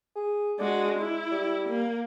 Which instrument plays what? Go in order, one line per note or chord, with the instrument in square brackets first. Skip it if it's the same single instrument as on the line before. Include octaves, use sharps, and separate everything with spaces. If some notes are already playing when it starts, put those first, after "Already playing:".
[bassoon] G#4
[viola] G#3 F#4 [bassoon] D4
[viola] E4
[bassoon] G3
[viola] A#3